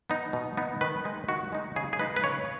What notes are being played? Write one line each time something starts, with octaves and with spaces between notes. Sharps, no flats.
B3 D#4
B2
B3 D#4
D#3 B4
G#3 D#4
D#3 F#4
G#3 D#4
C#3 G#4
G#4
G#3 D#4 B4
B4
C#3 C#5